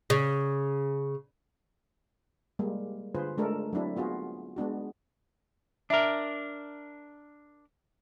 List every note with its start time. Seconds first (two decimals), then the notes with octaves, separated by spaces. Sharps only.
0.10 C#3
2.59 G3 G#3 A#3
3.15 D3 F4 G#4 B4 C5
3.38 G#3 A3 D4 A4 A#4
3.73 F#3 C4 D4 E4
3.96 B3 F4 F#4 G#4
4.56 G#3 B3 D4 F#4
5.90 D4 A#4 E5 A#5